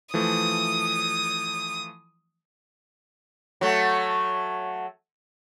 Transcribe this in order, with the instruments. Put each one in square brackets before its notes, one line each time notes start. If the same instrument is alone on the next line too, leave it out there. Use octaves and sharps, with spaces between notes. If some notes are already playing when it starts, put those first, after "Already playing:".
[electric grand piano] E3 F3 A3 [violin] D#6
[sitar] F#3 A3